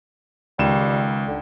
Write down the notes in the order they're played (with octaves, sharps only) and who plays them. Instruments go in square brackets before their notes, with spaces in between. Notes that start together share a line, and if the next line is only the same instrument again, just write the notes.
[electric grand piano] C#2 D#3 E7 [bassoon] G3
[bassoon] D3